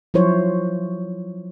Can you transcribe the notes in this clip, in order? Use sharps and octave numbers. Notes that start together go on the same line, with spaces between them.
F3 F#3 E4 C5 C#5